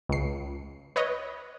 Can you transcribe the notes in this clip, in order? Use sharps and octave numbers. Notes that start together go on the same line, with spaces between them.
C#2 C7
B4 C#5 D#5